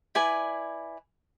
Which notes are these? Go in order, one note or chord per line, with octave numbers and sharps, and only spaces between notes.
E4 B4 D5 G#5